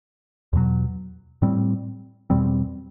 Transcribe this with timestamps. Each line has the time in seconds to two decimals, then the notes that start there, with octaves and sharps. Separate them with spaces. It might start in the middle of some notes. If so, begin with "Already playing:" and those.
0.53 E2 B2 F#3
1.42 A2 G3 C4
2.30 E2 B2 G3 C4